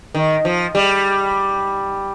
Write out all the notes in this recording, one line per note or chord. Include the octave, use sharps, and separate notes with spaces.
D#3
F3
G3